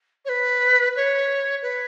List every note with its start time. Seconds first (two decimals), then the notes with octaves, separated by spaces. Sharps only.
0.25 C#5
0.29 B4
0.96 C#5
1.62 B4